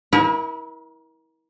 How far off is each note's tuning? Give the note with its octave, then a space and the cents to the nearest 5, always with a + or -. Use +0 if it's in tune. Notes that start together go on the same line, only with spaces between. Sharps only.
E4 -30 A#4 +35